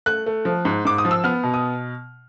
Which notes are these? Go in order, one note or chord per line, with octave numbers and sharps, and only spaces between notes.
A3 F#6
A3
F3
G#2
G#2 D6
D#6
F3
E6
B3 F6
B2
D#6